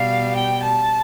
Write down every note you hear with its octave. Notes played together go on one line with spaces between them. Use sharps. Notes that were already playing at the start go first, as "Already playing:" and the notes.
Already playing: B2 G3 F5
G5
A5